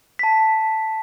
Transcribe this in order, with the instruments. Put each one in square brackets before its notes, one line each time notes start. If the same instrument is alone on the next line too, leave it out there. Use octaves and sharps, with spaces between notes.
[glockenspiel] A5 B6